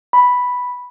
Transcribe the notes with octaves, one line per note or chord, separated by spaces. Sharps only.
B5